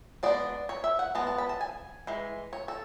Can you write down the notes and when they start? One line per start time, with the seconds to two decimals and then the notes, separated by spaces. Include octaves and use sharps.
0.23 G#3 B3 D4 D5
0.69 C#5
0.84 E5
0.99 F#5
1.15 G#3 B3 A5
1.27 A5
1.38 B5
1.49 A5
1.61 G#5
2.07 E3 G#3
2.53 C#5
2.68 A4